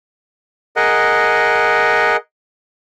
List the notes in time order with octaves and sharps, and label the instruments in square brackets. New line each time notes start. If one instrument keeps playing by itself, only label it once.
[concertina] G#4 A#4 D#5 F#5